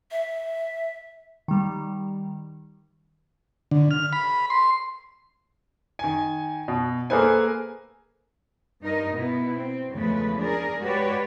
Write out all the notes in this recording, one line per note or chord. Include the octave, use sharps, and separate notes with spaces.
E5
D#3 G3
D3
F6
B5
C6
D#3 G#5
B2
A#3 G#4 A4 B4 C5 G#5
G2 D#4 A#4 D#5
B2 B3 E4
C4
E2 C#3 F3 G#3 A3 B4
D4 G#4 A#4
G#3 F#4 G4 B4 C#5 D5